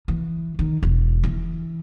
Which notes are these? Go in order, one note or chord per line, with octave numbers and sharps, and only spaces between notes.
E3
D#3
E1
E3